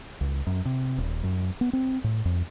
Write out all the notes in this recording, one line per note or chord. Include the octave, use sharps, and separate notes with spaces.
C#2
F#2
C3
D#1
F#2
B3
C4
A2
F2